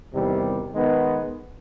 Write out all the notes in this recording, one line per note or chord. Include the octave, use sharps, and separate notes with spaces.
E2 C3 D#3 G3
D#3 G#3 B3